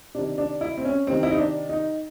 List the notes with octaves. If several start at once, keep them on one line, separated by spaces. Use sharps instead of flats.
C3 D#3 D4
D4
E4
C4
C#4
C3 D#3 C4
E4
D#4
D4
D#4